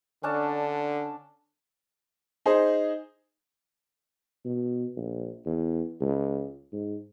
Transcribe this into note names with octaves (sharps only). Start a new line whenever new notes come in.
D3 C#4 D4 A5
D#4 G#4 C5
B2
A#1
E2
C#2
G#2